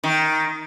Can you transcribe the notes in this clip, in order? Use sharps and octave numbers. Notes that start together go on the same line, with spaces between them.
D#3